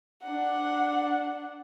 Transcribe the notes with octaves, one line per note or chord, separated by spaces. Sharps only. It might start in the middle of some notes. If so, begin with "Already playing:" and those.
D4 F#5